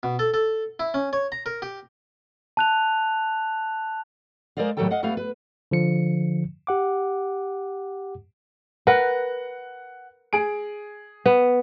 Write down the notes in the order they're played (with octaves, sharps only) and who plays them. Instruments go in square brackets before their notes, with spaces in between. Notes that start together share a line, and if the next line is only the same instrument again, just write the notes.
[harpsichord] B2
A4
A4
E4
C#4
C#5
A#5
A#4
G4
[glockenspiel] A5 F#6 F7
[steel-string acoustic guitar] G#3 A#4 C5 D5 D#5 F5
A2 D#3 F#3 G3 A4 G5
D#5 F5 F#5
G3 A3 B3 B4 F5
B4
[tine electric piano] D3 F3 C#7
G4 F#5 D6
[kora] A#4 B4 [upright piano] F#5
[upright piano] G#4 D7
[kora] B3